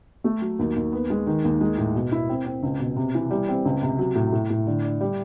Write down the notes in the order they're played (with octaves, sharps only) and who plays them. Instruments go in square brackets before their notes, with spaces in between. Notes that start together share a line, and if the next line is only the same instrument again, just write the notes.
[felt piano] A3
F#3
D#2
D#2
B3
G#3
D#3
D#2
G#3
A2
B2
E4
C4
C4
C#2
B2
C3
E3
G3
C4
C#2
C3
F#3
A2
A2
A2
D3
D4
G3